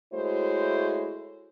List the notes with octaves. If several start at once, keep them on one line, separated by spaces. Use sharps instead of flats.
G#3 A3 E4 F#4 C5 C#5